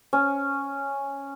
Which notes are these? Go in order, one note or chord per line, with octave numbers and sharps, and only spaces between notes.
C#4